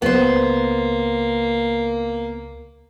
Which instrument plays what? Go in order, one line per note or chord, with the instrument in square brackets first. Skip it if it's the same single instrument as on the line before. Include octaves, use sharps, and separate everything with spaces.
[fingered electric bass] C#2 [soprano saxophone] A#3 [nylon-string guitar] B3 C5